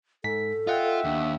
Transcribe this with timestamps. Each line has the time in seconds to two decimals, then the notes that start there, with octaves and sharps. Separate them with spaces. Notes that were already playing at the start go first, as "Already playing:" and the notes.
0.24 G#2 A4 B6
0.67 F4 D#5 E5 F#5 G5
1.04 D#2 D4